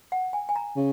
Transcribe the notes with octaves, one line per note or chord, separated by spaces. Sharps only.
F#5
G#5
G#5
A#5
C#3